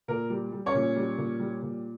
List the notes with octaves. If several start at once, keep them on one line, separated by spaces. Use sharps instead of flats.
A#2 A#4
G3
G3
C#4 C#5
A#2
G3
A#2
G3
A#2